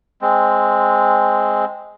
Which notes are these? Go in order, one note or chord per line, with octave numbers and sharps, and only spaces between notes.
G#3 C4